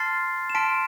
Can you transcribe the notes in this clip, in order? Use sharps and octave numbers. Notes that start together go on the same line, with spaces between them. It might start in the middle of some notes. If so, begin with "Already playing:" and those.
Already playing: A5 C6 F6 A6 C7
E7
A5 C6 F6 B6 D7